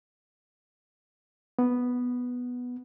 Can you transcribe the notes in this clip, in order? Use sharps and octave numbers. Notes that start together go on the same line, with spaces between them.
B3